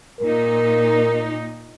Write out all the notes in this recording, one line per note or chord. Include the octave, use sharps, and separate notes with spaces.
A#2 D#4 A#4